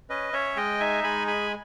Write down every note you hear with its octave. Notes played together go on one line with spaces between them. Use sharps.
C#4 B4 D#5
C#4 C#5 E5
G#3 D#5 G5
D#4 E5 G#5
G#3 G#5 B5
G#4 G#5 B5